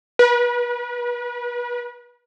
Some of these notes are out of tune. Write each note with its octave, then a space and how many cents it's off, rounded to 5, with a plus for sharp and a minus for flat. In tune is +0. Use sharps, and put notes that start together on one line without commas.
B4 -35